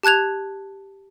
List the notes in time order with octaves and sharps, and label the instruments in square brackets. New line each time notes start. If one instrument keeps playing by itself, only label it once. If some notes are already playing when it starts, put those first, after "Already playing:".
[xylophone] G4 A5 F#6 G#6 F7